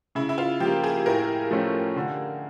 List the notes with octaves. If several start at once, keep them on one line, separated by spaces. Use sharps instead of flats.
C#3 E4
E4
F4
F3 G4
A#3
G#4
A2 A#4
F3 A3 C#4
D3